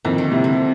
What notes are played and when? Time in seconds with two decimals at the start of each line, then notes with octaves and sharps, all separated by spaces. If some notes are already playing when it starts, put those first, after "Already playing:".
0.05 F2 D#3
0.18 D3
0.32 C3
0.44 D3